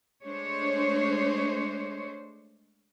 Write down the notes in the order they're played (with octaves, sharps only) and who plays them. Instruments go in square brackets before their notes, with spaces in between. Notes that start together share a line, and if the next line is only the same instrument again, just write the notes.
[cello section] G#3 A3 D4 C5 C#5